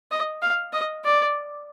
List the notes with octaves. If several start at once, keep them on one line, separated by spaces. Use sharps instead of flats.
D#5
F5
D#5
D5